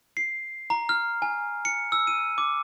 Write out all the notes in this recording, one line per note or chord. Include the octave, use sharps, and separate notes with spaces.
C7
A#5
F6
G#5
C#7
E6
D#7
D6